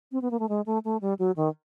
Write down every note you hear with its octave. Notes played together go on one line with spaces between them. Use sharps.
C4
B3
A#3
A3
G#3
A3
A3
G3
F#3
D#3